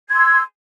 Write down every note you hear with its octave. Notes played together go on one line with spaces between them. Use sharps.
C6 E6 G#6